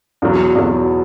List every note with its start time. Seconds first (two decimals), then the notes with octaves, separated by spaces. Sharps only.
0.22 E2 B2 F#3
0.55 E2 B2 F#3